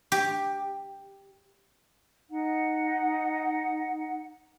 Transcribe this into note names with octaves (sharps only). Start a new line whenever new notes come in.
G4
D#4 F#5